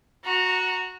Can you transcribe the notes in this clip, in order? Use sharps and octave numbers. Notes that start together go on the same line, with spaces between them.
F#4 A#5